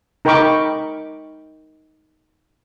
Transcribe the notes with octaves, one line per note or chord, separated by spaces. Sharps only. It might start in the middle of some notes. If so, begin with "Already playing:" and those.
D#4 A#4 G5 B5 C#6 D6